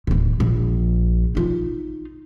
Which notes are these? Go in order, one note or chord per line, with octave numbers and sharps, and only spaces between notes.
D1 D#2
A#1
D#4 F4